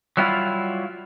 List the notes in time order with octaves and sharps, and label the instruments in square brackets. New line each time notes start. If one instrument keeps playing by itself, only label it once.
[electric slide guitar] F#3 G3 E4 F4